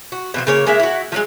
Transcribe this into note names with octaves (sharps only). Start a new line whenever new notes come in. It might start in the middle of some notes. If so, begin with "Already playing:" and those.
F#4
B2 D#3 F3
C#3 A#3 C#5
G#3 A#3 E4 E5
E4 F#4
F3 F#3 G#3